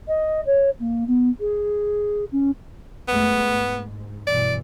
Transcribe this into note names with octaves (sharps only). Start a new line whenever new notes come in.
D#5
C#5
A#3
B3
G#4
C#4
F#2 G#3 A3 B3
G#2
G2 B2 E3 D5